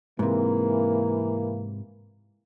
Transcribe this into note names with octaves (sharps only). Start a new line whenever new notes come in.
G#2 C3 E3 A#3